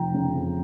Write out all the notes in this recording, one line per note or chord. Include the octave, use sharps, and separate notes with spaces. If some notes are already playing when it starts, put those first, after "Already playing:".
Already playing: F1 G5 A#5
C#3
F2